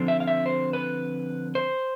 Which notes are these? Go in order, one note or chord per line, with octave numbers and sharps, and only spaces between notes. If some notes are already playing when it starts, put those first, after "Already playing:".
Already playing: D3 F3 C4
E5
F5
E5
C5
B4
C5